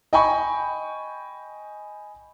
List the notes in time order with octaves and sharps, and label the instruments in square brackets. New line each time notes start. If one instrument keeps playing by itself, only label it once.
[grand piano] D#5 G5 G#5 B5 C#6